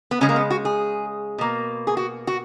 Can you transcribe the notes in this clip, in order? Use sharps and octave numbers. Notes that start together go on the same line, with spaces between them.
B3
C#3 G#3 C#4
A#3
B3
F#4
G#4
B2 A#3
G#4
F#4
F#4